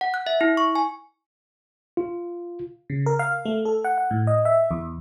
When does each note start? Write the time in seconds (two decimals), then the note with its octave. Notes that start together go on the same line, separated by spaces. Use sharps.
0.01 F#5
0.14 F#6
0.27 E5
0.41 E4
0.57 C#6
0.75 G#5
1.97 F4
2.90 C#3
3.06 A#4
3.19 F5
3.45 A3
3.65 A4
3.84 F#5
3.98 F#5
4.11 A2
4.27 D#5
4.45 E5
4.71 E2